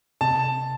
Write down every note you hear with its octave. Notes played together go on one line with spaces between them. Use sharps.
C3 A5